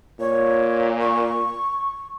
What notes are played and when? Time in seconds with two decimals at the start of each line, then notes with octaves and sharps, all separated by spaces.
0.20 A#2 C#5
1.01 C#6